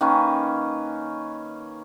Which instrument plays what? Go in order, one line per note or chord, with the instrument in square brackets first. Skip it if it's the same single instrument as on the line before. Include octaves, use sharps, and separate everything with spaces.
[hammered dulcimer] D#3 A#3 C#4 B4